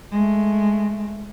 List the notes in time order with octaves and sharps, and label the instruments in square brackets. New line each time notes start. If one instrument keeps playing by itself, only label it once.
[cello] G#3 A3